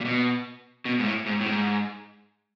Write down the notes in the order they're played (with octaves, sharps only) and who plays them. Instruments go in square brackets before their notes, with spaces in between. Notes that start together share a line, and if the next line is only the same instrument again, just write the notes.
[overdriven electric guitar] A#2
B2
B2
G#2
A2
G#2
A2
G#2